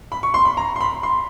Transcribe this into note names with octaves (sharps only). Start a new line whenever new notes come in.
B5
C#6
C6
B5
A#5
C6
B5
C6